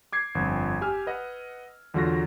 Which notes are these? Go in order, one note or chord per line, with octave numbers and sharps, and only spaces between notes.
D6 G#6 C7
G1 F2
G4 G#5 E6 F6
B4 D#5 F#5
E2 D3 F#3 F4 C#6 A#6